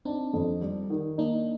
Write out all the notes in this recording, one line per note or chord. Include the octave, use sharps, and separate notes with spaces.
C4 D4 D#4
F2
G3
D#3
A#3 D4 D#4